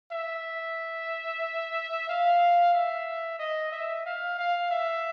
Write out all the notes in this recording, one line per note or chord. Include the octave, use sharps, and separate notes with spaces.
E5
F5
E5
D#5
E5
F5
F5
E5